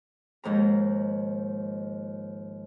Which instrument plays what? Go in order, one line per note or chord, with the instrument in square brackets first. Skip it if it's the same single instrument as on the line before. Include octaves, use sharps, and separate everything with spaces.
[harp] D#2 G#2 F3 A#5